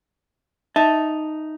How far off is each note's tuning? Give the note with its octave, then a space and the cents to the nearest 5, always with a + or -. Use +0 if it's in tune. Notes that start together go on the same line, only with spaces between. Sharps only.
D#4 -5 E5 -15 A5 +0